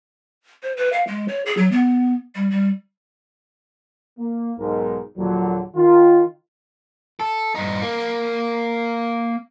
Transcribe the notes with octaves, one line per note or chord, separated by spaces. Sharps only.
C5
B4
F5
G#3
C#5
G#4
F#3
B3
G3
G3
A#3
B1 G#2 D#4 A#4
A#1 D#2 A#2 D3 F#3
D#3 F4
A4
G2 D#4
A#3